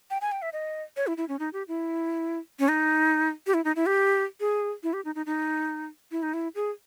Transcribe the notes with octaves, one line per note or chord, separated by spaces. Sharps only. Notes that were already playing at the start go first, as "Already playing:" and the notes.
G5
G#5
G5
E5
D#5
C#5
E4
E4
C#4
D#4
G4
E4
C#4
D#4
G4
E4
D#4
E4
G4
G#4
E4
G4
D#4
D#4
D#4
E4
D#4
E4
G#4